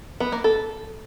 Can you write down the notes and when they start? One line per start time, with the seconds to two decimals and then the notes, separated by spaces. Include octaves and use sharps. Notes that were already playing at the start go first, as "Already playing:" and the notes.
0.20 B3
0.32 A#3
0.44 A4